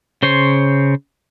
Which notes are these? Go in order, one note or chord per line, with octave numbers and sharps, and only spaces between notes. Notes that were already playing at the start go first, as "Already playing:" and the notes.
C#3 C5 C#5 C6